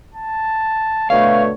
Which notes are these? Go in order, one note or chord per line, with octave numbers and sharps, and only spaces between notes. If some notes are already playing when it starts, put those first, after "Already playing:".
A5
B2 D3 A3 C#5 F5